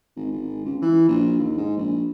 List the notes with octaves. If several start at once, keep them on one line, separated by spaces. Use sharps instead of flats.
G#1
G#1
C#2
E3
A#1
D#2
G#2
A#1